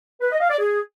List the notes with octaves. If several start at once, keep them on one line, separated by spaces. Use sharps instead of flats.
B4
D#5
F5
D5
G#4